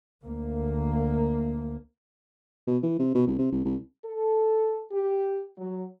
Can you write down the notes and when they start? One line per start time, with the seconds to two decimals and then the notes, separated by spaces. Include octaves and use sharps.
0.22 D2 A#3
2.67 B2
2.83 E3
2.99 C3
3.15 B2
3.27 C2
3.38 C3
3.52 C2
3.65 C2
4.05 A4
4.91 G4
5.58 F#3